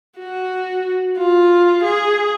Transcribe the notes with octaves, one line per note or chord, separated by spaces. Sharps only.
F#4
F4
G#4